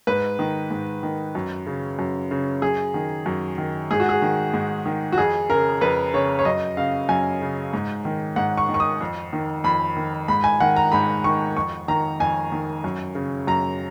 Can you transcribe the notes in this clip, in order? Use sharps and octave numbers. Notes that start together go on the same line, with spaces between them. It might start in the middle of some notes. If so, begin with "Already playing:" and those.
G#2 B4
D#3
G#2
D#3
F#2
C#3
F#2
C#3
F#2 G#4
D#3
F#2
D#3
G#2 G#4
F#4
G#4
D#3
G#2
D#3
F#4
F2 G#4
C#3 A#4
F2 B4
C#3 C#5
C#5
F#2 D#5
C#3 F5
F#2 G#5
C#3
G#2
D#3
G#2 F#5
C#6
D#3
C#6
D#6
F2
D#3
F2 B5
D#3
G#2 B5
G#5
D#3 F#5
A#5
G#2 B5
D#3 C#6
F2 C#6
D#3 A#5
F2 G#5
D#3
F#2
C#3
F#2 A#5